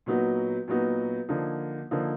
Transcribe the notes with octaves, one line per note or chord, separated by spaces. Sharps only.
A#2 F#3 B3 D#4 F#4
A#2 F#3 B3 D#4 F#4
D3 F3 A#3 D#4
D3 F3 A#3 D#4